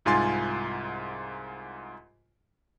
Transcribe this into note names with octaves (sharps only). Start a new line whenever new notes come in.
C2 G#2 F4 G#5 C6 A6